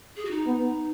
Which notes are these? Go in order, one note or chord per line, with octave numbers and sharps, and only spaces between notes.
G#4
F#4
D#4
B3